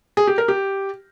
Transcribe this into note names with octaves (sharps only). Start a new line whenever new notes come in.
G#4
G4
A#4
G4